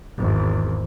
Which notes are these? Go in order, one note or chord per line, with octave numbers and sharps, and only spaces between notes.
G#1 E2